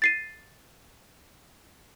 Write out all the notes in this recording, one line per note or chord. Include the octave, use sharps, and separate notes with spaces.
A6 C7 D#7